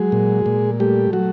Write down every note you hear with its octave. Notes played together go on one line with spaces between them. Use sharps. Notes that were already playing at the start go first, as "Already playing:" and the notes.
Already playing: F#3 G#3 G#4
A#2
A#2
G3 A3 G4
F#3 F#4